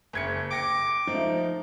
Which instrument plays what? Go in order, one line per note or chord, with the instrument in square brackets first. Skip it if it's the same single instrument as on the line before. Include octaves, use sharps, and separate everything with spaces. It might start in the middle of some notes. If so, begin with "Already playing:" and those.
[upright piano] F#1 G#6 C#7
[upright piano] G5 A#6 C#7 [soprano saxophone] D6
[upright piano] F3 A3 [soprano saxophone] D#4